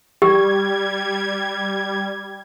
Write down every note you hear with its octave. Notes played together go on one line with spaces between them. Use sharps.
G3 G4 G#6